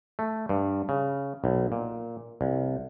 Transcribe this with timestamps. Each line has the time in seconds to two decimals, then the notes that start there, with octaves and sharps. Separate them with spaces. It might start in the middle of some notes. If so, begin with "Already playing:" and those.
0.19 A3
0.49 G2
0.89 C#3
1.44 B1
1.72 A#2
2.41 C2